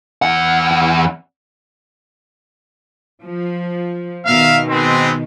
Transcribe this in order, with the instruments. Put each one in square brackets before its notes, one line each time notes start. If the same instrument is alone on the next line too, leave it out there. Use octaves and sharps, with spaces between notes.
[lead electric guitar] E2 F#5
[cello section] F3
[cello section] B2 D#3 [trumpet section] A#4 E5 F5
[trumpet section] G#3 B3 C4